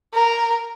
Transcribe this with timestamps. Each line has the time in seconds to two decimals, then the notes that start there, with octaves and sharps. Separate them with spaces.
0.14 A#4